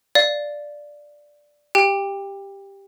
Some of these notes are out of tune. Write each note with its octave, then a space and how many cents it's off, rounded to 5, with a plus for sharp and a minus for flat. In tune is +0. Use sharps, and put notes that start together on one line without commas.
D5 +0 F5 +0
G4 +5 G5 +25